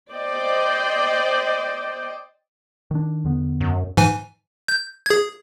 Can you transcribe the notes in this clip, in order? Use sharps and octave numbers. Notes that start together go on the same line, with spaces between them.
C5 D5 D#5 G5
D#3 D4
E2 D3 B3
F#2
G#2 E3 G#5
G6
G#4 G#6